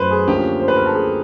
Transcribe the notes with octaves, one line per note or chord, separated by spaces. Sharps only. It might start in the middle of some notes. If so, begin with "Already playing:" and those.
Already playing: F#2 F#3 A3 B4 C5
G#4
D2 D3 F3 A#3 C#4 G4
C5
B4
A#4
A4
G#4